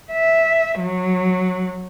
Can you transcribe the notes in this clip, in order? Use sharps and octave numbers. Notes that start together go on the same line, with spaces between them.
E5
F#3